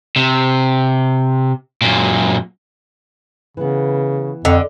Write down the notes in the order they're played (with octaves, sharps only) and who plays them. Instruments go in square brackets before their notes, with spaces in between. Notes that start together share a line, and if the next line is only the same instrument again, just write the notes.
[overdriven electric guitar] C3
F#2 A#2
[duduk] C#3 [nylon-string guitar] E3 B3
[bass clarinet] F2 [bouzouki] D3 [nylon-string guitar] D#5